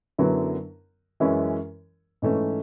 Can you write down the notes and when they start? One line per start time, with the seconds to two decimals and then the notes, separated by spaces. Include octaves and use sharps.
0.18 F#2 D3 F#3 B3 E4
1.20 F#2 E3 G#3 C#4 E4
2.22 G#2 E3 A3 C#4